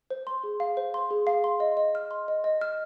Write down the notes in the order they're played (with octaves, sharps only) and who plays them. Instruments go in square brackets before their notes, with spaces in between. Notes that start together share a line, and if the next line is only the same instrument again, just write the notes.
[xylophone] C5
C6
G#4
F5
C5
C6
G#4
F5
C6
D#5
D#5
F6
C6
D#5
D#5
F6